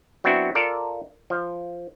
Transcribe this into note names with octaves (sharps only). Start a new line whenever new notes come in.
F#3 B3 C4 D4 E4 F#4
F4 A4 A#4 D5
F3